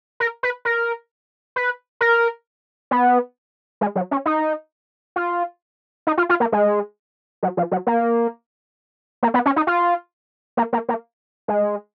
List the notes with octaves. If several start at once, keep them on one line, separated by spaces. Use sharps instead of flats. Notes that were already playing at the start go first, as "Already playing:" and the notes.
A#4
B4
A#4
B4
A#4
B3
G#3
F#3
C#4
D#4
F4
D#4
F4
F4
A#3
G#3
F#3
F3
F#3
A#3
A#3
B3
C#4
D#4
F4
A#3
A#3
A#3
G#3